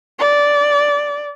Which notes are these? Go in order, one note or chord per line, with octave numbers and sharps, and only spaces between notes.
D5